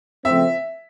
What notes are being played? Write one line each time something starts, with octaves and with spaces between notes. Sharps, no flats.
C#3 F3 A3 C4 E5